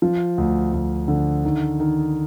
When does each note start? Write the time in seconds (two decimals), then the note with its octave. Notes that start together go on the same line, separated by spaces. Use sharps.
0.02 F3
0.38 D2
0.73 D2
1.08 D3
1.44 D#3
1.80 D#3